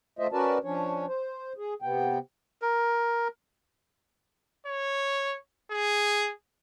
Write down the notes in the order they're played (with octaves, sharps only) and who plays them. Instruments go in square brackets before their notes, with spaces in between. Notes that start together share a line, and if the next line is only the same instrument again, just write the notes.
[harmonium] A3 F4 C5 D#5 E5
C#4 F#4 A#4 B4 D5 A5
F3 C#4 D4 C#5
C5
G#4
C3 B3 G5
[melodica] A#4
[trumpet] C#5
G#4